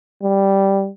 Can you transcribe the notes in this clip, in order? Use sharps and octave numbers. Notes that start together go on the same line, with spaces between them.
G3